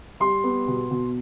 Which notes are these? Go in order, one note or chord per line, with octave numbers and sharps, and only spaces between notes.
G3 C6
B3
B2
B2